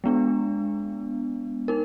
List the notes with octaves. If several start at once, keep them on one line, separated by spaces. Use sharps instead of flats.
G#3 B3 D4
D#4 A#4